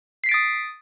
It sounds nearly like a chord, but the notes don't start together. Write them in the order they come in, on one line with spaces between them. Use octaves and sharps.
C7 B6 D7 A6 D#6